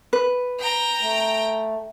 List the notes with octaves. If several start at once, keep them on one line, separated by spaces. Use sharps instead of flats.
B4
G5 A#5
A3